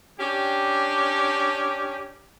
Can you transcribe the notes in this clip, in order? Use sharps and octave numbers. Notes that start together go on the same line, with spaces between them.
C#4 D4 G4